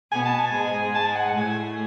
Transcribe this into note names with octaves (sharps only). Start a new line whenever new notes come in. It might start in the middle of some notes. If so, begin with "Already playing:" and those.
B2 B3 G#5
A5
G#5
G#2 G#3
A5
G#5
F#5
F#5
A2 A3 G#5